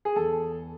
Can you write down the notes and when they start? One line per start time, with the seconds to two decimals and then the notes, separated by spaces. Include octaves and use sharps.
0.05 G#4
0.16 E2 A4